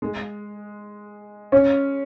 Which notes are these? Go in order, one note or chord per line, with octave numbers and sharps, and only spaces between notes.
G#3
C#4